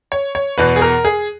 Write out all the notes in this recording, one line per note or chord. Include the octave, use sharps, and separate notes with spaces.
C#5
C#5
E2 B2 B4
G#4
A#4
G#4